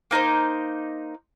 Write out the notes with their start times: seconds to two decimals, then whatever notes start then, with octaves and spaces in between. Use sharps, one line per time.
0.11 A#3 D#4 B4 C5